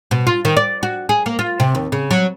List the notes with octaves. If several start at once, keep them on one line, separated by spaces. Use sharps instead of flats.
B2
F4
D#3
D5
F#4
G#4
A#3
F4
C3
D#2
C#3
F#3